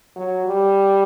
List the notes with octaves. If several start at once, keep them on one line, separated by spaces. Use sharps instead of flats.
F#3
G3